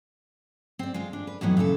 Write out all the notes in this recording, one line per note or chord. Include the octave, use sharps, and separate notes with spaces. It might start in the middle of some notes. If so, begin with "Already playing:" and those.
C4 D5
G#3 F4
D4
B4
F2 A2 E3 F#3 B3 D#4
A#2 C#3 E3 A4